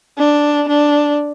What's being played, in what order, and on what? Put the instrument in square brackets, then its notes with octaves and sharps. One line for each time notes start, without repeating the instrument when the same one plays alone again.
[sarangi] D4
D4